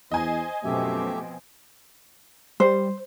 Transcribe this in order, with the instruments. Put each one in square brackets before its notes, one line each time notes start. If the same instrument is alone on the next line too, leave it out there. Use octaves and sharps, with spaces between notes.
[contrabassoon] E2 [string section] C5 [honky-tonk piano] D#5 G#5
[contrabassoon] F#2 [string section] B2 F3 C4 [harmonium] A3 G4 E5
[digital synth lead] G3 [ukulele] C5